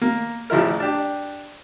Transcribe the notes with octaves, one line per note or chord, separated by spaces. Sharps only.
A#3
A1 C#3 F3 E4 A#4
D4 G4